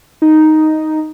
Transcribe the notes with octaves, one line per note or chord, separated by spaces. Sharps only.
D#4